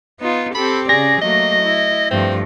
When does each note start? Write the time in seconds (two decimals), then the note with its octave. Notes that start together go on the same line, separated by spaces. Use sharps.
0.20 B3 D#4 F4
0.55 C4 G4 A4 B5
0.89 C#3 G#4 D5 A#6
1.21 F#3 A3 A#3 D#5
1.62 E4
2.11 G2 F3 A3 C4